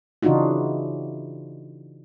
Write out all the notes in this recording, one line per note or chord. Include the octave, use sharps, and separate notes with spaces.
C#3 E3 D4 D#4 F4 F#4